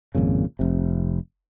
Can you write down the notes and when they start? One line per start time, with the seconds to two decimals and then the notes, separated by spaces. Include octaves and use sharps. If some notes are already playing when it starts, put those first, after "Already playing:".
0.15 G#1 F2 A#2 C#3
0.59 F1 C3